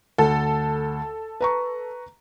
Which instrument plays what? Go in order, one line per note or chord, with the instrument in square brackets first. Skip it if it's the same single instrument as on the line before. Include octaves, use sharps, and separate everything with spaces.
[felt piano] D2 [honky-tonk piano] A4
[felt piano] B4 A#5 C#6